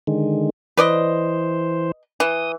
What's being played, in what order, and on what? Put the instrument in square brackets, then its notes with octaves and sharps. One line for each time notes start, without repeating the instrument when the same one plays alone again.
[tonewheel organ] D3 D#3 G#3
[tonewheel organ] E3 C5 [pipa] B4 D5 D#5
[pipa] E3 [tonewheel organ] D#6